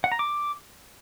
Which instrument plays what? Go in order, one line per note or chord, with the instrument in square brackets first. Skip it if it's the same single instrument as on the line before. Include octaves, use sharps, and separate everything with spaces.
[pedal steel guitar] F#5
A#5
D6